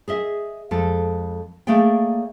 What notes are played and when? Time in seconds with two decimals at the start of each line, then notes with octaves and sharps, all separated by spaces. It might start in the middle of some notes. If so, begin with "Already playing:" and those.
0.08 G#4 D#5 E5
0.71 F2 G#3 A4
1.67 A3 A#3 G#4 D5 G5